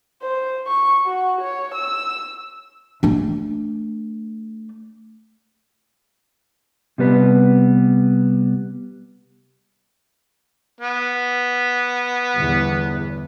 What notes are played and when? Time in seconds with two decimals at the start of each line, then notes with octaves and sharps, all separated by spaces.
0.22 C5
0.67 C#6
1.06 F#4
1.41 C#5
1.74 E6
3.03 A3 D4
6.98 C3 G3 B3 B4
10.81 B3
12.37 G1 E2